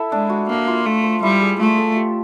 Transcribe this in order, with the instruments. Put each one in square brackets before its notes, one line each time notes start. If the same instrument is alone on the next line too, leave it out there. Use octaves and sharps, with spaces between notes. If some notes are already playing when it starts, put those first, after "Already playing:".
Already playing: [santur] E4 A4 E5
[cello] G#3 [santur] D4
[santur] F#4
[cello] A#3 [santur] D4
[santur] F4
[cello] A3 [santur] A4
[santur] C5
[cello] G3 [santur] E4
[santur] G#4
[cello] A3 [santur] F4
[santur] A4
G4